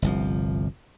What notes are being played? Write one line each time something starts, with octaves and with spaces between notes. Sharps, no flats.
G1 C2 F3